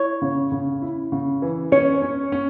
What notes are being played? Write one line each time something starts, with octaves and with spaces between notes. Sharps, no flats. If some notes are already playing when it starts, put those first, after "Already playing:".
Already playing: E4 C#5
C#3
C#3
E4
C#3
E3
C#4 C#5
C#4
C#4